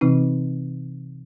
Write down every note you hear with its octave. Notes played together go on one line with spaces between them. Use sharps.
C3 E3 C4 D#4